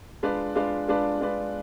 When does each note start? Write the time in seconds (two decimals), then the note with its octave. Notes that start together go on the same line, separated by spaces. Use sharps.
0.23 G#3 D4 F4 B4 D5
0.55 G#3 D4 F4 B4 D5
0.88 G#3 D4 F4 B4 D5
1.20 G#3 D4 F4 B4 D5